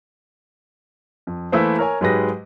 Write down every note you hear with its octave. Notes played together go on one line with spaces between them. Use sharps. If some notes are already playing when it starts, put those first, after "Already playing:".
F2
E3 A3 A#3 E4 B4 C5
A#4 C#5 G#5
G#2 F#3 G#3 G4 B4 A#6